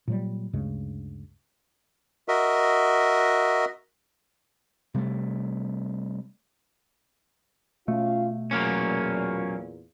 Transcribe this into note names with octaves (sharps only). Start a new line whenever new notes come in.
A#2 F#3 G3
D2 G2 C#3 G#3
F#4 A#4 D#5 E5
C3 G3 A3
B2 A3 C#4 F4 F5
E2 A#2 F#3 A#3 C#4